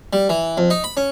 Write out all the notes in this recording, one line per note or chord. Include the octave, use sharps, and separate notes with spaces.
G3
E3
F2
D#4
B5
C#4